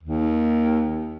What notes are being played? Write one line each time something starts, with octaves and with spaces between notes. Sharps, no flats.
D#2